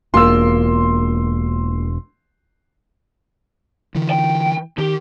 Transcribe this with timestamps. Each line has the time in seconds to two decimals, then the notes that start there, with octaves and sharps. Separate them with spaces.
0.14 E1 A#3 F4 C6 E6
3.95 D3 E3
4.10 G5
4.78 D#3 G4